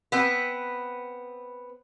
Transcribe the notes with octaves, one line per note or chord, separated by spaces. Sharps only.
B3 C4 B4